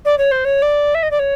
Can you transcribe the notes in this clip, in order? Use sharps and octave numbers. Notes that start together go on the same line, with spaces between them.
D5
C#5
C5
C#5
D5
E5
D#5
D5
C#5